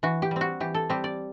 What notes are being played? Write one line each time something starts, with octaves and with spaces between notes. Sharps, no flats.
E3 F#4
G4
G3 C4
F#4
E3 G4
A4
G3 C4 G4
D5